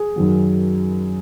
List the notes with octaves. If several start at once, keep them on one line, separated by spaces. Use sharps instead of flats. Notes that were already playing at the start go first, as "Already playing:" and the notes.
Already playing: G#4
F#2 D#3 F#3